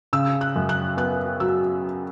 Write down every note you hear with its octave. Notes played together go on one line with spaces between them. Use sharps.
C#3 E6
F#6
F#2
F#6
B3 F#6
F#3 E6